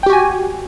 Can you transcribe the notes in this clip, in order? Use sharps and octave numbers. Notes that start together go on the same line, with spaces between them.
F#4 G4 G5 G#5